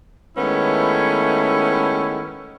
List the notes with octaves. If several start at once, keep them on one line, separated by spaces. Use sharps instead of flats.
D#3 G#3 A3 B3 C#4 E4